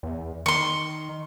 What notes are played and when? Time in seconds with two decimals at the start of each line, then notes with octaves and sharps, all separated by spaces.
0.03 E2
0.46 D#3 C6 C#6